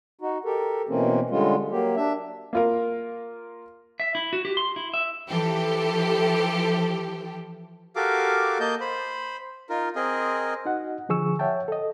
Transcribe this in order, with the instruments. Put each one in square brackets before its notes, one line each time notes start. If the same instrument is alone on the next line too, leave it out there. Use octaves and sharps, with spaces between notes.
[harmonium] D#4 F#4
G4 A4 A#4
B2 E3 A#3 C4 C#4
D3 G3 G#3 C#4 F4
F#3 A#3 G4
D4 E5
[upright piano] A#3 F4 A#4
[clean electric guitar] E5
E4
F#4
G4
C6
E4
E5
[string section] E3 F3 G4 A4
[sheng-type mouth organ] F#4 G4 A4 A#4 F5 D6
A#3 D#5 A5 G6
C5 B5
D#4 F4 A#4
C4 G#4 A#4 D#5
[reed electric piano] D#4 F#4 D#5 F#5
D3 F3 G#4 C#6 E6
C#5 E5 F#5 G5 A5
A4 D#5